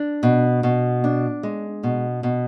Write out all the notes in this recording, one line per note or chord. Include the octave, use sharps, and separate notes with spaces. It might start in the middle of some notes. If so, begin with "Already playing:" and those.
Already playing: D4
B2
B2
D4
G#3
B2
B2